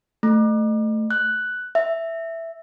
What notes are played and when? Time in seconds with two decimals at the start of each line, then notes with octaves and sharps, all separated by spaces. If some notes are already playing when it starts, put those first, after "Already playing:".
0.23 A3
1.11 F#6
1.75 E5